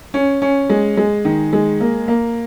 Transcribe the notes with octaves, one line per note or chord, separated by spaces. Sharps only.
C#4
C#4
G#3
G#3
D#3
G#3
A#3
A#3